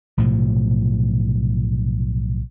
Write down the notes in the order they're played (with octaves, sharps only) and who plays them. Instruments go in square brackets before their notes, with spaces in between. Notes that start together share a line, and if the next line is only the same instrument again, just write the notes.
[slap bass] B1 A2 C3 F3